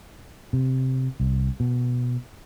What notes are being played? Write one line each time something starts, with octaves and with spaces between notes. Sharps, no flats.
C3
C2
B2